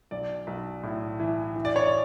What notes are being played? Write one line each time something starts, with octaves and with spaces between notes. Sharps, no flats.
B1 D5
B1
A2
E3
E3
D5
C#5
D5